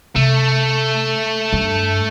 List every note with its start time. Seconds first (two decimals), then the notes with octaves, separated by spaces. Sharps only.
0.16 C3 A3
1.53 G2